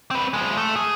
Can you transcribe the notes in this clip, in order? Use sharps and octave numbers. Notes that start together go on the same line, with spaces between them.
C4 B4
F3 G#3
A3
G#4